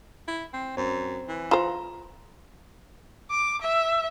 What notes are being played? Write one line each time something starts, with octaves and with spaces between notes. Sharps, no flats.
E4
C4
F#2 C4
E3
F4 C5 A#5 E7
D6
E5